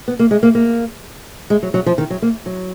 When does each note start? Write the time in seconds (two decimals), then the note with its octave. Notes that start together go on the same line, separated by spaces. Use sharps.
0.08 B3
0.19 A#3
0.31 G#3
0.43 A#3
0.55 A#3
1.50 G#3
1.63 F#3
1.74 F#3
1.86 F3
1.98 D#3
2.10 F#3
2.22 A#3
2.46 F#3